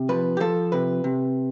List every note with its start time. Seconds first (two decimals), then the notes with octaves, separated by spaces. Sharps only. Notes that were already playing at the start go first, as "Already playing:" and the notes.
Already playing: C3
0.09 F3 B4
0.37 G4
0.40 F3 A4
0.72 C3 B4
1.04 C3